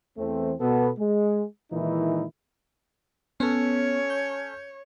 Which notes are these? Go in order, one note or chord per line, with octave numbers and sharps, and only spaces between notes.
E2 E3 A3 C4
B2 B3 A4
G#3
A#2 D#3 E3 G#3 D#4 E4
B3 C#4 A4 C#5
G6